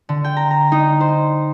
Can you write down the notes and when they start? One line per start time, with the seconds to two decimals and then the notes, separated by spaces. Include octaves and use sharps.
0.09 D3
0.24 G5
0.37 A#5
0.51 A#5
0.72 D#4
1.00 C5